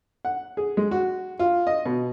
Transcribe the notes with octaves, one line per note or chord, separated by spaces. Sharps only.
F#5
G#4
G#3
F#4
F4
D#5
B2